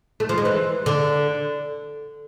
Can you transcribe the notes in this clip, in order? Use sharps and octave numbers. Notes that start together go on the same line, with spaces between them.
A3
F3
G#3
E3
D3